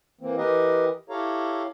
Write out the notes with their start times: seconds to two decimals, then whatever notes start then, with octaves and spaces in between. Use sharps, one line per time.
0.21 E3 A#3 C4
0.38 E3 G4 A#4 B4 D#5
1.10 E4 G4 A4 C#5 F5 A#5